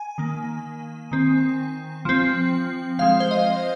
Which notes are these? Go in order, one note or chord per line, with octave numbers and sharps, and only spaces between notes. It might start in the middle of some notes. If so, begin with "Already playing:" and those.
Already playing: G#5
D#3 A#3
D#3 C4
F3 C4
F3 G#3 C4 F5
C5
D#5